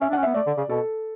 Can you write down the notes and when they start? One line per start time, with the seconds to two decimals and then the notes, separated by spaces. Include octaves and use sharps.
0.01 C#4 E5
0.10 D4
0.13 C#4 F#5
0.23 B3 E5
0.34 A3 D5
0.46 D3
0.57 C#3
0.69 B2 A4